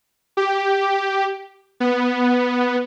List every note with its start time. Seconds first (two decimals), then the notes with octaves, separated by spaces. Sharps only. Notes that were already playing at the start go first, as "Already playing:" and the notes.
0.37 G4
1.80 B3